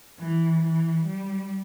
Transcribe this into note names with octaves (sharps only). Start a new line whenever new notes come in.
E3
E3
G3